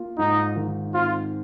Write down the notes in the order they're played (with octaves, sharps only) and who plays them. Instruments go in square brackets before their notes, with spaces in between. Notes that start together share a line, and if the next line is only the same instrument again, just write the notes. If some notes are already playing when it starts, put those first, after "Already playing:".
Already playing: [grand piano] A#3 F4
[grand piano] G#2 [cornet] D#4
[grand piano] D#3
[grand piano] C4 [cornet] F4